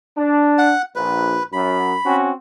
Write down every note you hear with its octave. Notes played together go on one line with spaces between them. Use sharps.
D4
F#5
A#1 B4
F#2 B5
C4 C#4 F#4